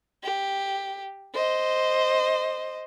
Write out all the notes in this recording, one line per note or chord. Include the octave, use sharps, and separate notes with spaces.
G4
C5 D#5